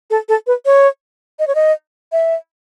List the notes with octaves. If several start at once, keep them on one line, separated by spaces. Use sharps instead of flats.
A4
A4
B4
C#5
D#5
C#5
D#5
E5